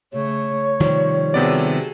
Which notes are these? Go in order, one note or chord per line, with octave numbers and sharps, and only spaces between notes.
C#3 A3 C#5
C3 D#3 F3 G3
C3 B3 F#4 G#4 A4 D5